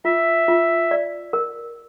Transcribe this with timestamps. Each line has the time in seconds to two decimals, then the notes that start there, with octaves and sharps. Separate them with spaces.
0.05 F4 E5
0.48 F4
0.91 D5
1.33 A#4